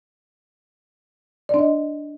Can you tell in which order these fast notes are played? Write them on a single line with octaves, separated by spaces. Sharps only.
D5 D4 D#5